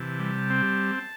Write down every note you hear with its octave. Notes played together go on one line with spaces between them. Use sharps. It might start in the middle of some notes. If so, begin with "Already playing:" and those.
Already playing: C3 E3 A5
G3
C4